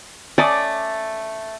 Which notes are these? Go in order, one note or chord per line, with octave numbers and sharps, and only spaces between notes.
A3 C#4 D5 D#5